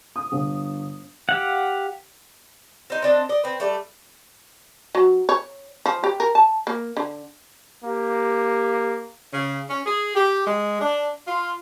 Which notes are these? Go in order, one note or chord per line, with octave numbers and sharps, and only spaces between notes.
D#6
G1
G4 F5 F#5
C4 D#4
C4 D4 D#5
D5 D#5
C4 B4
G3 A3
F#3
C#5
F3
G4
A#4
A5
A#3
D3
A#3 G4
C#3
C#4
G#4
G4
G#3
D4
F4